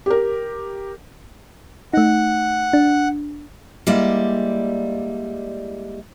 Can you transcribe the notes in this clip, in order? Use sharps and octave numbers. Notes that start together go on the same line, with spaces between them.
G4 A#4
A3 D#4 F#5
D4
G3 G#3 A#3 E4 D5